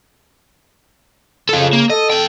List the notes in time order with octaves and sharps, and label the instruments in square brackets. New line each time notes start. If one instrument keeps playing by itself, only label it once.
[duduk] C#3 [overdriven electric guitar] F4 A4
[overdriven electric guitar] A#3
[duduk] A4 [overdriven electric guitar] D#5
[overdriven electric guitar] F2 G5